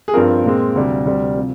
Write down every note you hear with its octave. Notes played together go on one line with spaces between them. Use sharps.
G#4
G2 F3 C4 F4 A#4
A#2 G#3 C4
D2 C3 G3
D2 C3 G3 C4
C3 F3